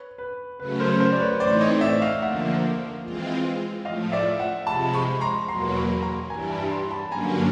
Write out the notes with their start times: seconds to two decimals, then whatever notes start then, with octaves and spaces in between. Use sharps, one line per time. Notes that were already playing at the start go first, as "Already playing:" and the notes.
Already playing: B4 C#5
0.18 B4
0.59 C#3 F#3 A3 C#4 B4
0.80 A#4 C5
1.00 A#4 C5
1.12 D5
1.20 B4 C#5
1.40 A2 E3 A3 C4 D#4 C5 D5
1.61 C#5 D#5
1.81 D5 E5
2.02 D#5 F5
2.22 D3 F3 A#3 E5 F#5
3.03 E3 G#3 C4 F4
3.85 A2 F3 A3 D#5 F5
4.12 D5 E5
4.40 E5 F#5
4.66 C3 F3 G#3 A5 B5
4.93 B5 C#6
5.21 A#5 C6
5.48 E2 B2 F#3 A#3 A#5 C6
5.75 B5 C#6
6.03 A#5 C6
6.30 G2 E3 G3 G#5 A#5
6.50 A5 B5
6.71 A#5 C6
6.91 A5 B5
7.11 G2 D3 F#3 A#3 C#4 G#5 A#5